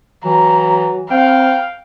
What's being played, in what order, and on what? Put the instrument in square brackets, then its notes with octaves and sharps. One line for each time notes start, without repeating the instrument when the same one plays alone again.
[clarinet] E3 [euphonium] F#3 [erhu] A#5
[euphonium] C4 [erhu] F5 [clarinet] G5